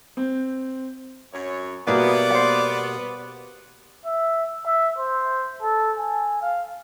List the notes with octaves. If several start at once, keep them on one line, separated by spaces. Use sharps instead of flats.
C4
F#2 C#5
B2 G3 A#3 B3 E4 G#4 D5
C5 F#5
E5
E5
C5
A4
G#5
F5